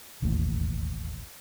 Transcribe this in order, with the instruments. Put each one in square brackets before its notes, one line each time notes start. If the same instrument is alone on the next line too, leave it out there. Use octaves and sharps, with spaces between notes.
[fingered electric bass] E1 A1 D#2 A2